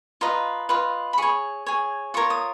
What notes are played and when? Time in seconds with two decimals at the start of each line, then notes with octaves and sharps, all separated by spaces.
0.21 F4 B4 D#5 A#5
0.69 F4 B4 D#5
1.13 B5
1.18 G#4 C#5 C#6
1.66 G#4 C#5
2.14 F4 A#4 C#5 C#6
2.30 D#6